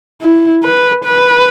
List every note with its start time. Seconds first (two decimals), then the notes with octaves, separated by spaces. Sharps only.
0.22 E4
0.64 B4
1.05 B4